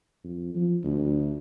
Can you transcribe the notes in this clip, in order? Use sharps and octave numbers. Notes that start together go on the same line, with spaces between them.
F2
F3
D2